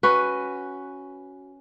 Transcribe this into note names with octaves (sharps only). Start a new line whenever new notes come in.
C#4 F#4 B4